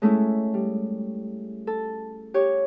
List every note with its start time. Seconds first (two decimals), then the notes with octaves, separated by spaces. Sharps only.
0.02 G#3 A3 C#4 E4
0.54 G3
1.67 A4
2.34 G4 C#5